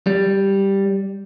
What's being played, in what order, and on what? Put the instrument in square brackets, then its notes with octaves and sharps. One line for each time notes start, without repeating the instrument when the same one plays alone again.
[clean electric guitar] G3